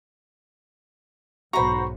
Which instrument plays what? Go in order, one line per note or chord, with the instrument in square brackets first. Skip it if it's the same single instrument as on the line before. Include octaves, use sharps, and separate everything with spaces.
[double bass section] B1 G#2 [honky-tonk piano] F#4 C5 [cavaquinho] A#5 B5 [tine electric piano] C#6